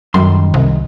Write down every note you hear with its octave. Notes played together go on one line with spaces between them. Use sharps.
F#2 D#3 G3 C6
C2